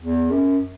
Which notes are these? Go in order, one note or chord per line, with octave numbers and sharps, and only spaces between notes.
E2
F#2